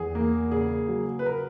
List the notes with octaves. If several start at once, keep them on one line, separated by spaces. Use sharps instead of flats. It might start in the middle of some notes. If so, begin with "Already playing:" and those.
Already playing: E2 G#4
A#3
C#3 G#4
F#3
B4
A#4